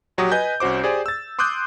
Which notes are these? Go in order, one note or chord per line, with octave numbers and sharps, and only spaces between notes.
A#1 F#3 F#4 G4 D#6
B4 D#5 G#5 G6
C2 C#4 F#4 C5 D6
G4 G#4 C5 D5 G#5
E6 A6
C6 D6 D#6 F#6 G6